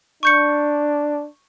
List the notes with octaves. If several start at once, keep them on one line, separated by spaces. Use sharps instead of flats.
D4 C#6 G6 C#7